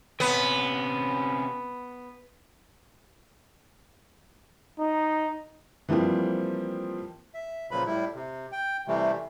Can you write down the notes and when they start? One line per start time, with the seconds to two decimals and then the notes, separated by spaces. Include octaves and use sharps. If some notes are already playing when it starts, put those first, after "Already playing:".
0.20 C3 B3 C#4
4.79 D#4
5.89 E3 F3 G3 A#3 C4
7.34 E5
7.71 A#2 C#3 F3 F#3 B4 B5
7.86 A2 G3 E4
8.15 C3
8.52 G5
8.88 C3 E3 G3 A3